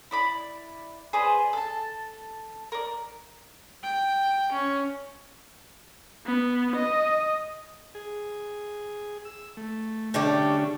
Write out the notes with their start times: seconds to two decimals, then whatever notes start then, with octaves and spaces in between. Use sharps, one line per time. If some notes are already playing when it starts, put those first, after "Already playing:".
0.11 E4 D5 B5
1.13 G#4 B4 C5 D5
1.53 A4 A5
2.72 A#4 D5
3.83 G5
4.53 C#4
6.26 B3
6.76 D#5
7.95 G#4
9.25 E6
9.57 A3
10.14 D3 G3 A3 C#4 D4 G4